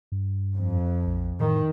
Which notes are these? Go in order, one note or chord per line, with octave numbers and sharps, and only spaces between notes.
G2
F2
A#1
A2 D#3